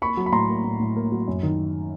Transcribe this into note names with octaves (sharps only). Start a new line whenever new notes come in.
A#3 B5 C#6
F#3
B5
A2 A#5 C6
A#3
A2
A2
A#3
F#3
F#2
D#3